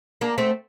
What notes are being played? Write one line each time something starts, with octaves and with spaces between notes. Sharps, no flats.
A#3 D4
A3 C4